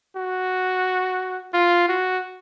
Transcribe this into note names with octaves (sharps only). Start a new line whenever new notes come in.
F#4
F4
F#4